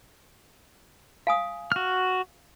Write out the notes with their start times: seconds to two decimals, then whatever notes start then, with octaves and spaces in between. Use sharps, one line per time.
1.27 F5 G#5 D#6
1.72 F#4 F6